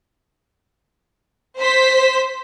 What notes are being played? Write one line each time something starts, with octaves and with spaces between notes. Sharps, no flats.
C5 B6